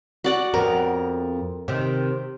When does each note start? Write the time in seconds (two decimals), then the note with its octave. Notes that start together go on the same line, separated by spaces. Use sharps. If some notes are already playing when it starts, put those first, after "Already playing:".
0.24 F#4 D5 F#5
0.54 F2 B3 A#4
1.68 C3 D#3